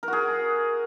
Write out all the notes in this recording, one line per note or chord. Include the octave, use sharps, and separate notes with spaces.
F#4 G#4 A#4